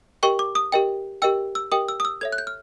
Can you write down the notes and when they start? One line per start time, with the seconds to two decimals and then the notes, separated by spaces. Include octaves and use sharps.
0.23 G4 A#4 D#5 G5 C#6
0.39 D6
0.55 D#6
0.72 G4 A#4 D#5 G5
1.22 G4 A#4 D#5 G5 E6
1.55 E6
1.72 G4 A#4 D#5 G5 D#6
1.88 E6
2.00 D#6
2.05 E6
2.21 A4 C#5 E5 G#6
2.32 F#6
2.38 G6
2.47 F6